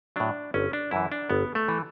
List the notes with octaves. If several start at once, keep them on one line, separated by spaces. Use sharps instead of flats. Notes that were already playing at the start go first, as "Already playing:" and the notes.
A2 F#3 D4
G1 C#4
D4
F#2 E3 E4
D4
G1 B3
A3
E3